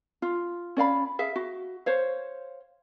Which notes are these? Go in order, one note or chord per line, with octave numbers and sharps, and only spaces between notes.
F4
C#4 D5 F5 B5
G#4 E5 F5
F#4
C5 C#5 F5